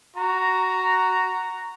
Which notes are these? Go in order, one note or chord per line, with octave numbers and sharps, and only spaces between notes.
F#4 A#5